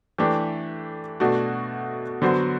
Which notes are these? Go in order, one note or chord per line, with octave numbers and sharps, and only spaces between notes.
E3 A3 D4 G4
B2 A3 D4 F#4
D3 F#3 B3 F#4 C5